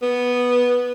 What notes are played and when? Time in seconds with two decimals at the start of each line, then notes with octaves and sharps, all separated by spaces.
0.02 B3